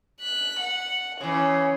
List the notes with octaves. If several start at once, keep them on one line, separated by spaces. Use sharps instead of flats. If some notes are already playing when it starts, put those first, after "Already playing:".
F#6 B6
F#5
C#3 E3 C#4